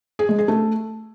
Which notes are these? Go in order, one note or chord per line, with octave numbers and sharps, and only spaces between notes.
G#4
G#3
G#4
A3